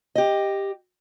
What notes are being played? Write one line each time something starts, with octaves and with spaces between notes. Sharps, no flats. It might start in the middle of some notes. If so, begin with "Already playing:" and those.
G4 D#5